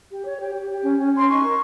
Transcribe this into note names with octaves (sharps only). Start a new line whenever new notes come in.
G4
C#5
G4
G4
G4
C#4
C#4
C#4 C6
D#4 C#6
A#4